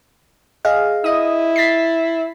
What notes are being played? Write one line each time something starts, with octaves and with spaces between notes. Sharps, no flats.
G#4 D#5 F5
E4 D#5 D#6
A6 B6 C7